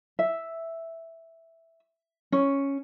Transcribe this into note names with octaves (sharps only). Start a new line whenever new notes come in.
E5
C#4